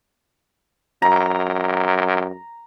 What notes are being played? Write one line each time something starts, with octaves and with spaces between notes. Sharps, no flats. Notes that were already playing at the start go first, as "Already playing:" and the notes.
F#2 A#5